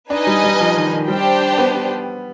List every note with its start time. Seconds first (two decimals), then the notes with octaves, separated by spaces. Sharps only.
0.10 D4 D#4 B4 D#5 G#5
0.27 G3
0.44 G3
0.60 F3
0.76 D#3
0.93 D#3
1.08 G3 D4 G4 C5 G5
1.58 B3